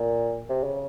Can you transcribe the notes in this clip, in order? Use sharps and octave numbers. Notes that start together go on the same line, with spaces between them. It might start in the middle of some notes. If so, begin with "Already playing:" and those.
Already playing: A#2
C3
C#3